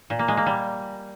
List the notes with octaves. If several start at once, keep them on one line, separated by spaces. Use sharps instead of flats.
A#2
A#3
G#3
A#3
G3